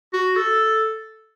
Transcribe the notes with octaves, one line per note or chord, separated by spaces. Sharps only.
F#4
A4